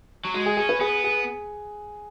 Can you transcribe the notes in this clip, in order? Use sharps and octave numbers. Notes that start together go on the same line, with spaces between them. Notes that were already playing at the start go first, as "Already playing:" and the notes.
F#3
G#3 F#4
G#4
C#4 G#4
B4
B3 G#4
G#4